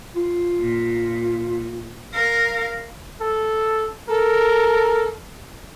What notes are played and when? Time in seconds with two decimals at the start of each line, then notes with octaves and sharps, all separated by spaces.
0.16 F4
0.60 A#2
2.13 A#4 F5
3.21 A4
4.09 A4 A#4